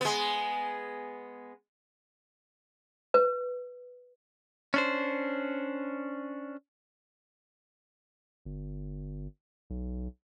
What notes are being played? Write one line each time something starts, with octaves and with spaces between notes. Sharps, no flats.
G#3 B3
B4
C#4 D4 C5
G1
B1